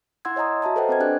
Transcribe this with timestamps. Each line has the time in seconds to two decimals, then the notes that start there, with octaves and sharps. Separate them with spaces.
0.25 E4 F#5 C6 E6 G#6
0.36 C#5 D#5 G#5 A#5 D#6
0.62 F#4 E5 A5 A#5
0.76 A4 B4 C5 D#5 F#5 G5
0.89 C4 B4 G#6
1.00 D4 G4 D5 G#5 F#6